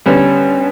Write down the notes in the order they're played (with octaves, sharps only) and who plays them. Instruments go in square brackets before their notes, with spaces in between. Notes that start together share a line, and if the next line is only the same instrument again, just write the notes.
[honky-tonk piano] D3 G3 B3 [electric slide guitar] C#4